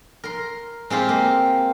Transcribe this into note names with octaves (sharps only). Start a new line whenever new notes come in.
A#4 C6
G#3 C4 F4 G4
A#3